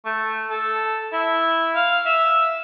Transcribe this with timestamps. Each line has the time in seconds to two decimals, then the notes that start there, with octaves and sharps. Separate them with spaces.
0.05 A3
0.51 A4
1.13 E4
1.75 F5
2.06 E5